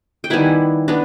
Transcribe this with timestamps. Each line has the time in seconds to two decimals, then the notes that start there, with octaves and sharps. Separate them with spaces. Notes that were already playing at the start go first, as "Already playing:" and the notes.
0.24 G5
0.30 D#3 G3 B3 E4 F#5 G#5
0.88 B3 D4